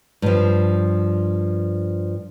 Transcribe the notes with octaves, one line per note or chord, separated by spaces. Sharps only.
G2 F3